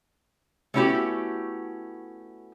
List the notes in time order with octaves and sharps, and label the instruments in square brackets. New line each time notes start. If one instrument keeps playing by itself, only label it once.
[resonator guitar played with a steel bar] A3 B3 C#4 E4 F#4 G4